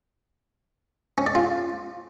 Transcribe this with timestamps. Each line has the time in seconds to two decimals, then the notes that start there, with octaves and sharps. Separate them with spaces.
1.18 C#4
1.26 D5
1.35 F4